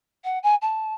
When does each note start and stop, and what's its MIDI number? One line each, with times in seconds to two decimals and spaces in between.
0.24 0.39 78
0.43 0.55 80
0.62 0.94 81